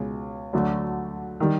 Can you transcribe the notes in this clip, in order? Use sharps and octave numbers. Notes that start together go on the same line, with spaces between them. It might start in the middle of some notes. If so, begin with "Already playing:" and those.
Already playing: C#2 B2 G#3
D2 D3 F#3 A3
D#3 G3